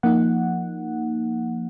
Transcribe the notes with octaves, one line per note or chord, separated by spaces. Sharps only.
F3 A#3 D#4 F#5